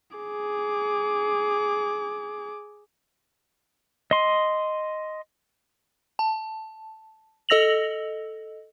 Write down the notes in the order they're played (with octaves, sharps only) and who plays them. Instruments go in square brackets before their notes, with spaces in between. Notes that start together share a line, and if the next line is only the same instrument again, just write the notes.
[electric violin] G#4 D6
[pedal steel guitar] D#5 C6
[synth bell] A5
A4 D#5 E6 A#6 F7 F#7